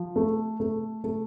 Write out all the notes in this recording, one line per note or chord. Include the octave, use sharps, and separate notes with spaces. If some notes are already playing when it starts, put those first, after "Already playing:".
Already playing: F3
A3
A3
A3